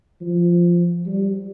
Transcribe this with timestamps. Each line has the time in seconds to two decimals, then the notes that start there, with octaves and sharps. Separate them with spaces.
0.21 F3
1.06 G3